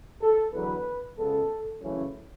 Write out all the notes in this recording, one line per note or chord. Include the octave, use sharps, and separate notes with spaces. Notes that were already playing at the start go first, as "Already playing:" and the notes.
A4
E2 D3 F#3 B4
C#2 C#3 G#3 B3 A4
F#2 C#3 E3 A3 C#4